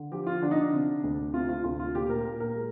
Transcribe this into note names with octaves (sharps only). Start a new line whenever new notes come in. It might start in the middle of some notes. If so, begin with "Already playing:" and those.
Already playing: D3
F3 G4
F4
D3 D4
D#4
D4
C3
D2
C3 F4
F4
D2 F4
F4
A#2 G4
A#4
A#2 A#4
A#4
G#3